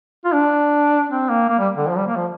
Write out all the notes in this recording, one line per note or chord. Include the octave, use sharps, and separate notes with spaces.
F4
D4
C4
A#3
A#3
G3
D3
F3
G3
A#3
F3